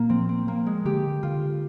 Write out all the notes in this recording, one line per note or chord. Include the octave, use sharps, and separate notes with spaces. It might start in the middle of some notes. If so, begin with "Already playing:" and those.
Already playing: A#2 A#3
F3 C4
C4
F3 A#3
G#3
D3 G4
D3 F4